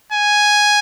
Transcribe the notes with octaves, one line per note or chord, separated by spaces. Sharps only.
G#5